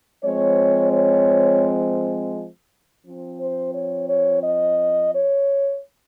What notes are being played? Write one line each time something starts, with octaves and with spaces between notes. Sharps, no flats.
F3 G#3 C4 C#5
C#5
F3 C4
C5
C#5
C#5
D#5
C#5